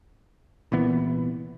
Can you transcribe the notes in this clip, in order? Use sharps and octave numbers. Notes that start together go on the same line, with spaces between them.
C2 A#2 E3 B3